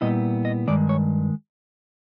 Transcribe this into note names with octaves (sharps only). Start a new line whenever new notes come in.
A#2 G3 B3 E4 D#5
D#5
G2 D#3 G#3 D5
C#5